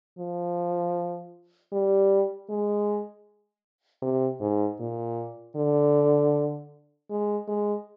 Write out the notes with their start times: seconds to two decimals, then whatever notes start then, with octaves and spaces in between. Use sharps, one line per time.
0.19 F3
1.73 G3
2.49 G#3
4.02 C3
4.41 G#2
4.80 A#2
5.56 D3
7.10 G#3
7.48 G#3